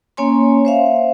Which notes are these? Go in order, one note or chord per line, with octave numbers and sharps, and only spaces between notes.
A#3 C#4 C#5 G#5 C6
C5 E5 F5